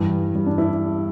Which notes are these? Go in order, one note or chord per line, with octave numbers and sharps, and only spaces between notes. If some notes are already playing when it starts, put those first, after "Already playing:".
Already playing: G2 E3 G3
G3
D4
E4